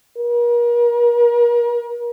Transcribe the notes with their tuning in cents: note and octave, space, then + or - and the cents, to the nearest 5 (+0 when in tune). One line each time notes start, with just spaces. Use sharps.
A#4 +40